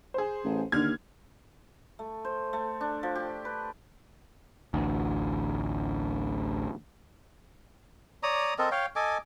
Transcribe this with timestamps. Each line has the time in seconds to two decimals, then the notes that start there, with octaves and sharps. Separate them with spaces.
0.14 G#4 C5
0.45 A1
0.72 D#2 D3 F6 G#6
1.99 A3
2.25 C5
2.53 A3
2.81 D4
3.03 F3
3.15 G4
3.45 B4
4.74 A1 D2
8.23 C#5 D5 A#5 D#6
8.58 C4 A4 A#4 D#5
8.71 C#5 F5 G5
8.96 A4 D#5 G#5 D6